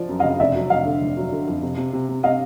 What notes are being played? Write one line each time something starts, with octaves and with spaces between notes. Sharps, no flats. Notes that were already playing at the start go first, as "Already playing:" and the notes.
Already playing: F3 D5
F#2
C#3 D#5 F5
F1 D5 E5
F#3
F1 D#5 F5
D3
F1
F#3
D3
F2
C3
C3
C3
C3
C3 D#5 F5